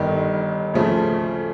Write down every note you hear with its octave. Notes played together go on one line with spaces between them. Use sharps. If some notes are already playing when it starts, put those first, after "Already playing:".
Already playing: G1 G2 D#3
D2 C#3 F3 A3